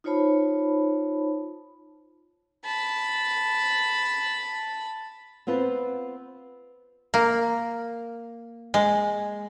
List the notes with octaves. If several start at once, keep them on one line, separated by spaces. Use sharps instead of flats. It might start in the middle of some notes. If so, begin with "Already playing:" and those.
D#4 F4 C5 C#5 A5 B5
A5 B5
B3 C4 F4 B4
A#3
G#3